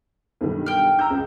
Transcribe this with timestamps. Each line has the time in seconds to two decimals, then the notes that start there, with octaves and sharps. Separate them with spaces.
0.41 B1 G2 D#3
0.66 G5 F6
0.99 A#5 E6 G6
1.10 C#2